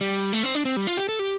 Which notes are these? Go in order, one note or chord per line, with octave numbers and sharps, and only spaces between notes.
G3
A3
C4
D4
C4
G3
F4
G4
A4
G4